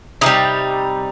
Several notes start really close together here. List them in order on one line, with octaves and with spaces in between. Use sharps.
C3 E3 D#4 G3